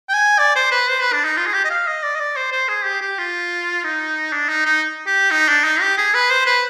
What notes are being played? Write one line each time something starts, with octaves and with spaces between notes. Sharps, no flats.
G5
G#5
D5
C5
B4
C5
B4
D4
D#4
F4
G#4
G4
D#5
F5
D#5
D5
D#5
D5
C5
C5
G#4
G4
G4
F4
D#4
D4
D#4
D#4
G4
D#4
D4
D#4
G4
G#4
B4
C5
B4